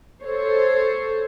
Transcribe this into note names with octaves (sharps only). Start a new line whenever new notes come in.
A4 C5 C#5